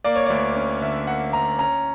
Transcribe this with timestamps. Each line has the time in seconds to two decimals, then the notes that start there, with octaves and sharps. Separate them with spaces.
0.04 A#3 D5
0.16 C#5
0.26 D2 D5
0.56 C#4
0.81 D3 E5
1.07 A#3 F#5
1.33 D2 A#5
1.59 C#4 A#5